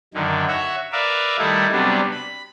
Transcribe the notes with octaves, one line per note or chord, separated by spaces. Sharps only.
F#2 D3 D#3
F#4 C#5 E5
A#4 B4 D5 E5 F5
D#3 G3 A3 D#4 E4
C3 F#3 G3 B3 D4
B5